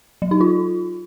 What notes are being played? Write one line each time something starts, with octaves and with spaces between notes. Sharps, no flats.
F#3
D#4
F4